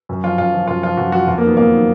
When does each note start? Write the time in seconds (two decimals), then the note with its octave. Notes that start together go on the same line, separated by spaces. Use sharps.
0.09 F#2
0.23 F3 F4
0.38 F#2 F4
0.54 F3
0.68 F#2 F4
0.83 F3 F4
0.97 F#2 F#4
1.12 F3 F#4
1.27 F2 F4
1.38 A#3
1.43 D#3 F#3 B3
1.57 F2 A#3
1.72 D#3 F#3